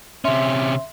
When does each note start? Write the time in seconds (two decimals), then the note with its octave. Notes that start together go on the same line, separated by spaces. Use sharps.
0.25 C3 C#4 E5 C6